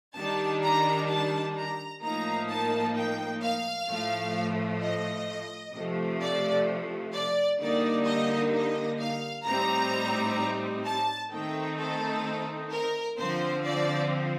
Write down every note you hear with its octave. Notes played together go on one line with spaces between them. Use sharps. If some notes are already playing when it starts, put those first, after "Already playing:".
D#3 G3 D4 A5
A#5
A5
A#5
A2 F3 A#3 D#4 A#5
A5
G5
F5
A2 F3 A3
D#5
C3 F3 A3
D5
D5
D3 G3 A#3 D#4 D5
D#5
D#5
F5
A2 G3 C4 D#4 A#5
A5
D#3 A3 C4 D#4 G5
A4
A#4
D3 F3 C4 C5
D5